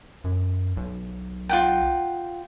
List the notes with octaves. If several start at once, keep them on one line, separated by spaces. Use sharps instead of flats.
F#2
B1
F4 F#5 G5